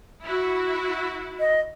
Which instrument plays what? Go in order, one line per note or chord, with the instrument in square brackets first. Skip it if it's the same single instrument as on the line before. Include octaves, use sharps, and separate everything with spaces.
[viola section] E4 F#4
[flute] D#5